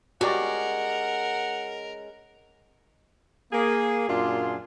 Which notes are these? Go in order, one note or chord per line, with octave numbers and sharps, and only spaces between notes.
G#3 C#4 F#4 G4 A#4 D5 F#5
A#3 G#4
F#2 A#2 D4 F4 G#4 C6